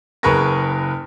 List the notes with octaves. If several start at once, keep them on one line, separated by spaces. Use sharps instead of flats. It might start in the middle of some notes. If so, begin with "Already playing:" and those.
F#1 G#4 A#4 B4 C#6 A#6